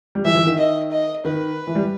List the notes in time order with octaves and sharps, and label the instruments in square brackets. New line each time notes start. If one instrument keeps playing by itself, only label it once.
[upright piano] G3
[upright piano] E3 [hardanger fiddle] E5
[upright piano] E3
D#3
[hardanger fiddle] D#5
D#5
[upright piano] D#3 [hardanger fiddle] B4
[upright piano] E3
G3